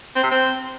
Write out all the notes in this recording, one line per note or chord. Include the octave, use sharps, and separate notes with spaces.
C4
C3
C4